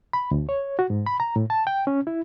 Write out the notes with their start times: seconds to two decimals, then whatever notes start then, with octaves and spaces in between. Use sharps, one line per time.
0.13 B5
0.31 D2
0.49 C#5
0.79 F#4
0.90 G#2
1.06 B5
1.20 A#5
1.36 A2
1.50 A5
1.67 G5
1.87 C#4
2.07 E4